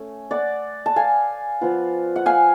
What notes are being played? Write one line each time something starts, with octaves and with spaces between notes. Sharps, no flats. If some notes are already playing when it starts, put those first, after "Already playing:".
Already playing: A3 C#4
D5 F#5
A5
F5 G#5
F3 B3 F4
F#5
F5 G#5